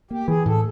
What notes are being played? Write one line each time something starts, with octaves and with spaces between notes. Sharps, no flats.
A#3 G4
E3 G#4
A2 A4